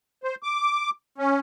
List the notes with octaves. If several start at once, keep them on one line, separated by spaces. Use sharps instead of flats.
C5
D6
C#4